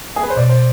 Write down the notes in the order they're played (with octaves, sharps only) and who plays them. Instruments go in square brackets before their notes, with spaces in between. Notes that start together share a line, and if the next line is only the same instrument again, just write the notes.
[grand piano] G#4
B4
C5
[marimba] B2 [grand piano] D5
[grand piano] C5